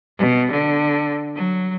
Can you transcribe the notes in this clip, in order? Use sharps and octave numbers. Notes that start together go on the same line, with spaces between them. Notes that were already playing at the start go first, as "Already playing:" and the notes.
B2
D3
F#3